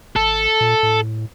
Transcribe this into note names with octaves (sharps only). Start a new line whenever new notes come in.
G#1 A4
A#2
A2